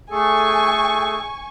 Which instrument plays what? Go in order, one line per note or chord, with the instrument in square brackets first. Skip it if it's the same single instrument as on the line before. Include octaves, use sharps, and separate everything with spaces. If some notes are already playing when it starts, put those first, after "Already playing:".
[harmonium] A3 G#4 A4 [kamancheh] G#5 C#6